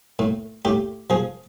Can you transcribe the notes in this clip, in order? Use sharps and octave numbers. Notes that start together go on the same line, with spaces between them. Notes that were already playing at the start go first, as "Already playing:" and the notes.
A2
A2 G4
F3 G#4